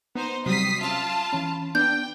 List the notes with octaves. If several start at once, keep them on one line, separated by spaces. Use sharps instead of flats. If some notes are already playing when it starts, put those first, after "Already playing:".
B3 D#4 C5
C3 F#3 G3 D#6 B6 C7
C#4 F4 E5 A5 F6
E3 C#4 B5
B3 D4 G5 G6